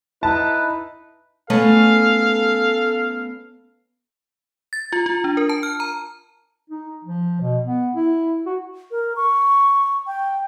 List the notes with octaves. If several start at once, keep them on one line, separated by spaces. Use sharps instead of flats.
D#4 E4 B4 A5
A3 B3 C#4 A4 F5
A6
F4
F4
D4
A#4
A5
F6
A#5
D#4
F3
B2
B3
E4
F#4
A#4
C#6
G5